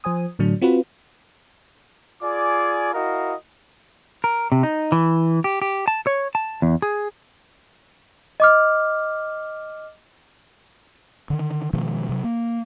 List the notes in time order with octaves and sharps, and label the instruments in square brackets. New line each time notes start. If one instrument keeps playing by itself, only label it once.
[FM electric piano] F3 C5 G#5 D#6
A2 D3 F#3 D4
C4 F4 F#4 B4
[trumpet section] F4 G#4 D5 G#5 D6
E4 F#4 A#4 D#5 F5
[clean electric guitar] A#4
C3
D#4
E3
G4
G4
A5
C#5
A5
E2
G#4
[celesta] D#5 D6 F6
[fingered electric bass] D3 D#3
B2 D#3 F3 G#3
C3 F#3
A#3